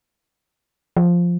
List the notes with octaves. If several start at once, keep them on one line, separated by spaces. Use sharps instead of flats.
F3